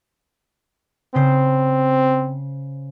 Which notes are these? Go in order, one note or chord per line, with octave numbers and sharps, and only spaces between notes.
C#3 C4 C5